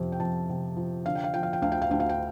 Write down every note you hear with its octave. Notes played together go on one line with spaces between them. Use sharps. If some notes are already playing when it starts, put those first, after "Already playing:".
Already playing: F2 C3 F3
G5
F2 A5
C3
F3
D3 F5
G5
F5
F3 G5
F5
G5
D2 F5
G5
F5
D2 G5
F5
G5